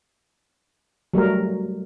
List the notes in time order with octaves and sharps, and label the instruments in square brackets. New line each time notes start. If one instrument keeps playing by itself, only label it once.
[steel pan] F#3 G3 A3 A#4